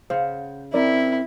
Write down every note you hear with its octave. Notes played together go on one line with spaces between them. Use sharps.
C#3 C5 F#5
C4 E4 A#4 D5